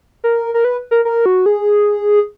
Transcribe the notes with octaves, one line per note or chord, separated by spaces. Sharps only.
A#4
A#4
B4
A#4
A#4
F#4
G#4